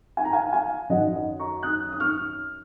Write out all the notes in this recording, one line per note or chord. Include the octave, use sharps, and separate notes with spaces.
G#5
A#5
F5 G#5
F5 G#5
F#2 D#3 D#5 F#5
D#5
A#5 C#6
D#6 F#6
D#6
C#6 F6